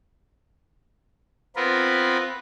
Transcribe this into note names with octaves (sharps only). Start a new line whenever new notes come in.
B3 C4 F4 A#4 B4